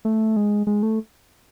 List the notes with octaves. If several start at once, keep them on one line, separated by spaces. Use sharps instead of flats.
A3
G#3
G#3
A3